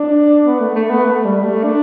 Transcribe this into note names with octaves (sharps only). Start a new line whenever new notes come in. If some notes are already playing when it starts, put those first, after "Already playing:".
Already playing: D4
B3
A3
A3
B3
A3
G3
A3
D4